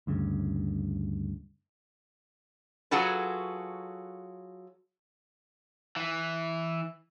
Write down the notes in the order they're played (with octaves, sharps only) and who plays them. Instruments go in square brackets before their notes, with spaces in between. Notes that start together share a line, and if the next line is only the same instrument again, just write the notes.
[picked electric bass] D2 G2 C#3
[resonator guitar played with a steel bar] F#3 F4 F#4 G#4 A4 B4
[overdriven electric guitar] E3